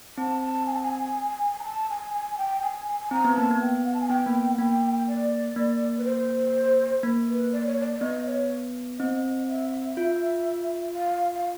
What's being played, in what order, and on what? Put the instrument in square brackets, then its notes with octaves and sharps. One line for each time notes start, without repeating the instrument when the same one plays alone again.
[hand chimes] C4 [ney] A5
[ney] A5
G#5
A5
G#5
A#5
A5
G#5
G#5
G5
G#5
G#5
[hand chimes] C4 [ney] A#5
[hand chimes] B3
[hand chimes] A#3 [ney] A5
[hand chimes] B3
[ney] G5
F#5
A5
G#5
[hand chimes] B3 [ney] G5
[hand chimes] A#3
[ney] F#5
[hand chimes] A#3 [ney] G5
[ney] D5
[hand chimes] A#3
[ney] B4
C5
[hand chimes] A#3
[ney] B4
D5
C#5
D5
D5
[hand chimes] B3 [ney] D#5
[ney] C#5
[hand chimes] C4 [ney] D#5
[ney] E5
[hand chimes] F4
[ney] F5
F5